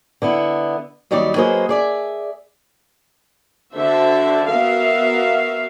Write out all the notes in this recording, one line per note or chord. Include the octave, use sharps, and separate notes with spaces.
D3 B3 E4
D#2 F#3 G3 D#4 G4 D5
F#3 A#3 G#4 B4 C5 D#5
G#4 D5 E5
D3 F#4 A4 C5 E5
B3 F#4 A#4 E5 F5